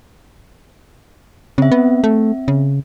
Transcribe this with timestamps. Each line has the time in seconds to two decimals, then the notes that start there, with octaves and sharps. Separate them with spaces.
1.58 C#3 C4 E5
1.72 B3
2.04 A3
2.48 C#3